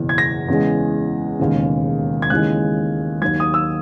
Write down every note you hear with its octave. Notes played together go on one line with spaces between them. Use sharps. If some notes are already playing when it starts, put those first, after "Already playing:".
Already playing: F#1 E2 B2
G#6
A#6
E2 C#3 G#3
E1 D#2 C#3
G#6
D#2 C#3 E3 G#3 F#6
D#2 D#3 F#3 G#6
D#6
E6